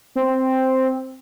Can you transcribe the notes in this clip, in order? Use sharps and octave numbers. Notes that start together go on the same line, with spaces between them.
C4